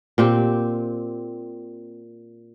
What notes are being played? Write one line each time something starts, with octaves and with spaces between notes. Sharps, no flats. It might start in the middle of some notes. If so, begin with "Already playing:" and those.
A#2 C4 G4